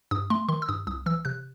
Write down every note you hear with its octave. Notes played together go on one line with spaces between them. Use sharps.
G2 D#6
A3 C6
D#3 C6
E6
G2 D#6
C2 D#6
E3 E6
C3 F#6